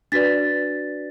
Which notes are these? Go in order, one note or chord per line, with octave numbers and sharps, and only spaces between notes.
D4 F#4 B4 D5 A6 B6